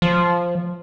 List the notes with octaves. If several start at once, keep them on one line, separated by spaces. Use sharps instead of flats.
F3